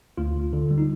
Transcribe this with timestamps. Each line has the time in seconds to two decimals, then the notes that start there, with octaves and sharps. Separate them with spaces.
0.17 D2 F4
0.35 D2
0.53 D3
0.71 G3
0.78 D#4